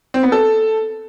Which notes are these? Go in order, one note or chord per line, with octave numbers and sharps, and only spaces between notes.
C4
B3
A4